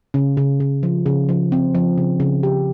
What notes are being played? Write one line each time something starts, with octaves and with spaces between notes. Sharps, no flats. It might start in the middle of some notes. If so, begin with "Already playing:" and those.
C#3
C#3
C#3
F3
C#3
F3
C4
F3
C#3
C#3
G4